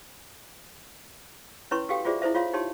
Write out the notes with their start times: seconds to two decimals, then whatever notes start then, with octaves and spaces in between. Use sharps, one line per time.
1.71 C#4 E4 B4 C#5 C6 C#6
1.89 F#4 G4 A4 F5 G5
2.05 F4 F#4 G#4 C5 D5 E5
2.22 E4 A4 C5 E5
2.35 F4 C#5 F5 C6
2.53 D#4 G4 C#5 A5 C6